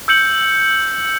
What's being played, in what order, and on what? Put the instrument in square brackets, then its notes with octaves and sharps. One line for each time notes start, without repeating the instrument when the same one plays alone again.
[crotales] E6 G6 C#7 F#7